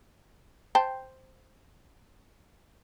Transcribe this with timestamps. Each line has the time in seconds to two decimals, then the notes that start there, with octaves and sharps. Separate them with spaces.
0.75 C5 G5 A5